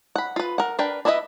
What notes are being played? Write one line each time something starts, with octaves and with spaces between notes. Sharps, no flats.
F#5 B5
F4 B4
A#4 F#5
D4 A#4 B4 G5
D4 E4 B4 D#5 E5